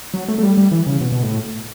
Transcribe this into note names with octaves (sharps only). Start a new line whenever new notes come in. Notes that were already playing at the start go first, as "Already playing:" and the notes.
F#3
A3
A3
G3
G3
E3
C#3
B2
B2
A2